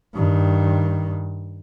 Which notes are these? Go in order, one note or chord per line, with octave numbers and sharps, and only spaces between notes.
G2 D#3